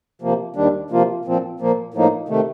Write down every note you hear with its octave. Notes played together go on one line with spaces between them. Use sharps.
C3 F3 A#3
D#2 D#3 G3 D4
C3 F3 A#3 F4
A#2 F3 C4
A#2 F3 A#3
A2 F3 A#3 D#4
C3 D#3 A3